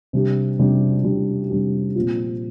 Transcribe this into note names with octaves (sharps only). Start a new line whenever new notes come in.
C3 G3 D4 G4
C3 G3 D4 G4
C3 G3 D4 G4
C3 G3 D4 G4
A#2 F3 C4 F4